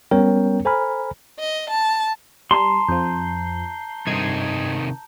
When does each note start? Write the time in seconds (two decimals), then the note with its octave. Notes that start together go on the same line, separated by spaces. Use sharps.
0.11 G3 B3 C#4 A#4 C#5 G5
0.65 A4 C5 G#5 A#5 B5 F6
1.40 D#5
1.70 A5
2.51 G3 A5 A#5 C6
2.89 F2 F3 G6
4.07 G2 C3 D#3 D#4 G#6